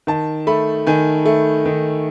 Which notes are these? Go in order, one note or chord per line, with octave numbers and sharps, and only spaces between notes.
D#3 A5
A3 B5
D#3 G#5
A3
D#3